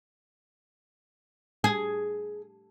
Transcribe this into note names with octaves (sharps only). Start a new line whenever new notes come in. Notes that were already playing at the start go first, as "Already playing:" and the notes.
G#4